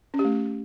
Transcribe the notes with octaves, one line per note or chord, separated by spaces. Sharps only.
C#4
G4
A3